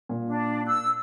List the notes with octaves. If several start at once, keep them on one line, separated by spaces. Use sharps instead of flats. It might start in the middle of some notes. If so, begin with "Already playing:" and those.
A#2
D4
E6 F#6